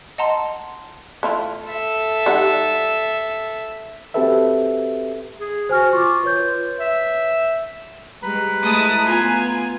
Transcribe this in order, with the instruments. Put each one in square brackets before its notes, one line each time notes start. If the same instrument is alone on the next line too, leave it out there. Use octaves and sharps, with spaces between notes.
[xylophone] D#5 F#5 A5 A#5 C6
[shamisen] A3 E4 F4
[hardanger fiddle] A4 E5
[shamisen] G3 D#4 F#5
[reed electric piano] C4 F#4 G4 A4 B4 E5
[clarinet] G#4
[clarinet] F#4 [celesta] C5 G#5 F6
[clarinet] F4 [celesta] C#6 D6
[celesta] B4 C#5 G6
[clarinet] E5
[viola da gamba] G3 G#3 [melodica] B4 B5 [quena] A#5
[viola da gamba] G#3 A3 [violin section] E4 A5 D#6
[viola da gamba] B3 F4 [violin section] G#5